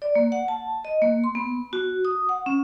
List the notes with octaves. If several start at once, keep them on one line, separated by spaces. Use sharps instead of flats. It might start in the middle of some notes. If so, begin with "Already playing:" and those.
D5
A#3
F#5
A5
D#5
A#3
C6
B3
F#4
D#6
F#5
C#4